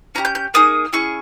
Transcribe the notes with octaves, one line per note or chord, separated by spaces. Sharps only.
C#4 E4 G4 A#5
G6
G6
A#3 D#4 G#4 D#6
C#4 E4 G#4 C#6